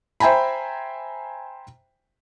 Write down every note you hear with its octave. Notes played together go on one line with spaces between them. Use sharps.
C5 E5 G5 G#5 A#5 B5